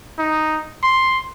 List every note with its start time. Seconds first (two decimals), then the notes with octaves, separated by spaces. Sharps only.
0.19 D#4
0.83 C6